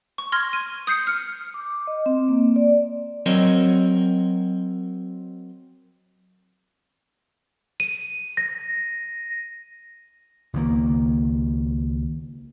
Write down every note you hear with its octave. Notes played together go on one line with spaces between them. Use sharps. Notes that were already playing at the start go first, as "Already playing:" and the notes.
C#6
C6 F6 G#6 A#6
D#7
D#6 G6 C7 C#7
F6 C#7
D6
D#5
C4
A#3
D5
F#3 C4 A#4 C#5 D#5
D#7
A#6
C#2 D#3 A#3